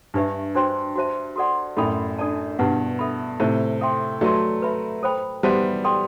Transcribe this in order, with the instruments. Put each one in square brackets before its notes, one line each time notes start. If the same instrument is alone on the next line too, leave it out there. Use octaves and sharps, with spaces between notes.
[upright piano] G2 [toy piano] D4 G4 B4 E5
[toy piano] D4 F#4 C5 G5 C6
F#4 C5 E5 A5
F#4 A4 D5 F#5 C6
[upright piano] F#2 A2 [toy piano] F#4 A4 D5 G5 B5
[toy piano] D4 A4 D5 A5
[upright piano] G2 B2 [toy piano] E4 B4 F#5
[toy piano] A4 E5 B5
[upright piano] A2 C3 [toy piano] C5 E5 A5
[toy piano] A4 E5 G5 C6
[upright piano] F#3 A3 [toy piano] B4 D5 A5 C6
[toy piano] B4 E5 B5
A4 C5 G5 B5
[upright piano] G3 B3 [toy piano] F#4 C5 E5 A5
[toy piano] A4 D5 G5 C6